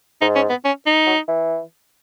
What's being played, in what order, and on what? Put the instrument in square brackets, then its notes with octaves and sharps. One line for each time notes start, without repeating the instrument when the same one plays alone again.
[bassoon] G#2 [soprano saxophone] D#4
[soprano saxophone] C#4
B3
C#4
D#4
[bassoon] F#3
E3